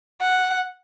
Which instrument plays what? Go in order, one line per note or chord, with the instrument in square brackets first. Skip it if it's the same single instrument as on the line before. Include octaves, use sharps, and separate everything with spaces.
[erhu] F#5